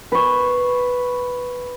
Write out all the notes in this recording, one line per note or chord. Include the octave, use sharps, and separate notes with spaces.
B4 C#6